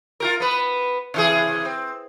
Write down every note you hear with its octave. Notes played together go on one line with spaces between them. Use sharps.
F4 G4 A#4
B3 B4
C3 E3 G#4
C4